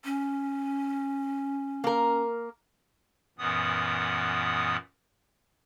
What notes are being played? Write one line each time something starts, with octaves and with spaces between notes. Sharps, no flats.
C#4
A#3 A#4
F#2 A#2 E3 B3 D#6